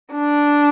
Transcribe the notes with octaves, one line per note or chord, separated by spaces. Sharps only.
D4